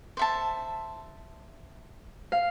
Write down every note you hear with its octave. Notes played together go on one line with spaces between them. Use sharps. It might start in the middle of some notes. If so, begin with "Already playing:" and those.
C5 E5 A5
F5